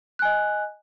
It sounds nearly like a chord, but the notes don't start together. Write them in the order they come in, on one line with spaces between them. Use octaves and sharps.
F#6 G#5 D#5